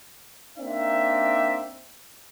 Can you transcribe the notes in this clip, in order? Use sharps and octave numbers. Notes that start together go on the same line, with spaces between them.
A#3 C4 D4 D#4 E5